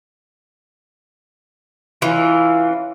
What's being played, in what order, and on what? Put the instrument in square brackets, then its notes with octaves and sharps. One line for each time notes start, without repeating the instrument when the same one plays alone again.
[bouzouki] E3 [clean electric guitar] C#4 F4